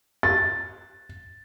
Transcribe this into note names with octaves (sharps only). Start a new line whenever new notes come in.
A6